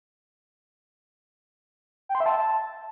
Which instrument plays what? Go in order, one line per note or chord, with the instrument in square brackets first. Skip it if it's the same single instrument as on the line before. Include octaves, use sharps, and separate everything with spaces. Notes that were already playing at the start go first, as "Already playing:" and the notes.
[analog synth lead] G5
C6
E5
A5